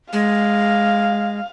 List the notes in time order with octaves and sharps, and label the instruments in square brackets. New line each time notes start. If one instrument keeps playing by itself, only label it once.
[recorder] G#3 [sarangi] F5